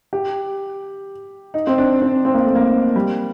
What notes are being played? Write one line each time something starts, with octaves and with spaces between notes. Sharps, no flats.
G4
D#4
C4
D4
C4
C4
A#3
A3
A#3
G3